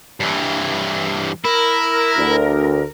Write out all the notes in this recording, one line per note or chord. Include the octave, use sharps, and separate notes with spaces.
G2 E3
E4 A#4
D2